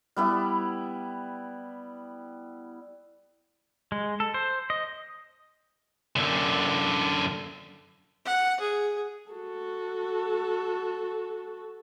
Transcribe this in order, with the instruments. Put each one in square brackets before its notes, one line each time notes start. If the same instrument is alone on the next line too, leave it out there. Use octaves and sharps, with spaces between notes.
[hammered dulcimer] G3 B3 E4
[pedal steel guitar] G#3
A4
C5
D#5
[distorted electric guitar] F#2 D3
[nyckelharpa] F#5
G#4
[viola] F#4 A4